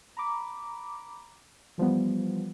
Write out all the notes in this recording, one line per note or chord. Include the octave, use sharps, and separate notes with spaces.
A#5 B5 D6
E3 F3 G3 B3